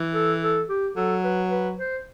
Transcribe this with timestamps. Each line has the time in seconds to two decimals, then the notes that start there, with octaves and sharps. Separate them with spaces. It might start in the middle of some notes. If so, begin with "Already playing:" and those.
Already playing: E3
0.14 A4
0.42 A4
0.69 G4
0.96 F#3 A4
1.24 B4
1.51 B4
1.78 C5